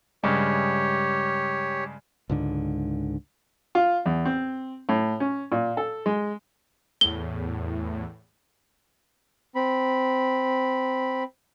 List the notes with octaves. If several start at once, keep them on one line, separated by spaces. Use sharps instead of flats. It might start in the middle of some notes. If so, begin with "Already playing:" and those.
G2 C#3 G#3 G4 C#5
C#2 G#2 D3
F4
E2
C4
A2
C#4
A#2
A4
G#3
E2 A2 G7
C4 B5